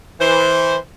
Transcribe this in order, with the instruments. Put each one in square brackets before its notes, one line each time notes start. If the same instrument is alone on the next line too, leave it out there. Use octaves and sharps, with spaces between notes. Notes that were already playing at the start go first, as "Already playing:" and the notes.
[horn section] E3 C5